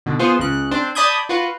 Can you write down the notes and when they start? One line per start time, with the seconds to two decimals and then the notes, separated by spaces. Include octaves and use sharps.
0.06 B2 D3
0.19 B3 F4 G#4 C5
0.39 C#2 C#3 F#6
0.71 C4 D4 C5
0.95 D5 A5 B5 D#6 G6 G#6
1.29 F4 F#4 B4